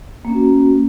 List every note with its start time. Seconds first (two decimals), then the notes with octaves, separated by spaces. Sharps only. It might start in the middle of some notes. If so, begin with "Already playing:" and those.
0.25 A#3
0.29 C#4
0.34 F#4